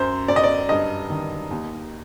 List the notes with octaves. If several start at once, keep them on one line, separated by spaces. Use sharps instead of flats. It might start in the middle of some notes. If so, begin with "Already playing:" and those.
Already playing: F#2 C5
F#2 D5
D#5
D5
G2 D#5
D#3
D#2